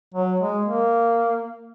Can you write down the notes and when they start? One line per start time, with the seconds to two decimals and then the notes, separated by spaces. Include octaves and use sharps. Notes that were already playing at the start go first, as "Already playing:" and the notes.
0.14 F#3
0.40 G#3
0.66 A#3